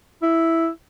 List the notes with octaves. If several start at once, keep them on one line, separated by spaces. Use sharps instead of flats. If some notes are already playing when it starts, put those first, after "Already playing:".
E4